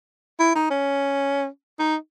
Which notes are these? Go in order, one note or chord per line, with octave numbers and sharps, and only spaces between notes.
E4
D#4
C#4
D#4